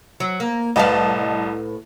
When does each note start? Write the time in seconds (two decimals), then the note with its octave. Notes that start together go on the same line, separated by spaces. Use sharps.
0.20 F#3
0.40 A#3
0.76 C2 A2 B4 D#5 F5 A5